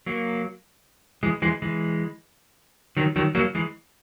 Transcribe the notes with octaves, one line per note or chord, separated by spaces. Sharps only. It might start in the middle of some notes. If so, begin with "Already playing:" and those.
F#3 A#3
E3 G#3
E3 G#3
E3 G#3
D#3 F#3
D#3 F#3
F#3 A#3
E3 G#3